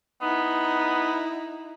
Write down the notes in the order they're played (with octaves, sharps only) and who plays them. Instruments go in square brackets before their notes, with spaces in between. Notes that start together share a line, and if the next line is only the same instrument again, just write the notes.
[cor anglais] B3 [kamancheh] D#4 E4